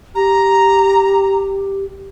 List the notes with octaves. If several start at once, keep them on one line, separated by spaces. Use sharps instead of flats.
G4 A#5